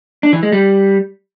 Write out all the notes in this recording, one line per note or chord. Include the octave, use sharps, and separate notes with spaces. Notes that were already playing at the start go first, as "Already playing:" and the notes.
D4
E3
G#3
G3